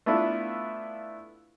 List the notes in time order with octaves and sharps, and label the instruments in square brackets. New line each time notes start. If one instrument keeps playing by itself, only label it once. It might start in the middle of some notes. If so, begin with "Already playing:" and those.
[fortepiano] A3 B3 D4 E4 F4